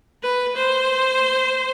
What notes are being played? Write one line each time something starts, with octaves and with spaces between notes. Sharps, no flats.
B4
C5